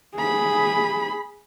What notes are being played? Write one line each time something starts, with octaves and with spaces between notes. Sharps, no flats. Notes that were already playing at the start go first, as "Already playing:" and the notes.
G#4 B5